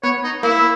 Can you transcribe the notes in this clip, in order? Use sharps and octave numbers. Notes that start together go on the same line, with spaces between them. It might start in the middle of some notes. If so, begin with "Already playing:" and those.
B3 C#5
D#4
A#3 E4